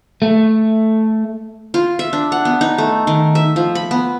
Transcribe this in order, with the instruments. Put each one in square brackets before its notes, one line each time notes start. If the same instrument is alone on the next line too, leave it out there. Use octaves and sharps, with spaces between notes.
[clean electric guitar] A3
[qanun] F4
E5
D4
F#5
B3
D#4
A3
D#3
E5
F3
B5
B3